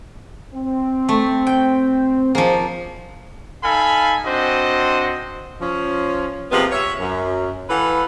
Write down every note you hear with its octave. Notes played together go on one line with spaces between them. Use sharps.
C4
A3
G5
D#3 F3 A#3 G#4 C5
D#4 A4 F5 G#5 B5
C4 D4 F#4 C5 D#5
F3 C#4
C3 F3 G#3 A#3 B3
C#5 E5
F#2
E3 A4 B4 F5 F#5